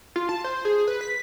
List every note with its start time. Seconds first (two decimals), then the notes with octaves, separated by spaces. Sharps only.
0.16 F4
0.29 A5
0.44 C5
0.65 G#4
0.88 B4
1.01 B6